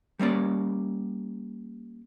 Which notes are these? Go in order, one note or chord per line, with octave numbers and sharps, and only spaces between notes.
G3 A#3 C#4 D5